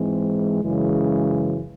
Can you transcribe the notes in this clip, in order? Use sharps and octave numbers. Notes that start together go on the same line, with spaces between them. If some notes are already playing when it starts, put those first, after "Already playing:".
Already playing: G#2 E3 G#3 C4
F#2 C#3 E3 G#3